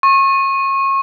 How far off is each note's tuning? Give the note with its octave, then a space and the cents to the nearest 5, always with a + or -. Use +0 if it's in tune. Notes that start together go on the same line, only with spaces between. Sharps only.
C#6 -30